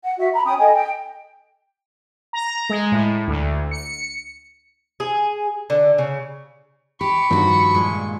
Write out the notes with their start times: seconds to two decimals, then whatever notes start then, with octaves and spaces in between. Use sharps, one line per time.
0.03 F#5
0.18 F#4 E5
0.33 A#5 B5
0.46 C#4 G5 D#6
0.58 A4 D#5 G5 G#5
0.73 G5
2.33 A#5
2.69 G#3
2.92 A2
3.28 D2
3.71 C#7
5.00 G#4
5.70 D3
5.98 C#3
7.01 G4 B5 C#6
7.31 G2 D#3 F3 F#4
7.74 A#2 G#3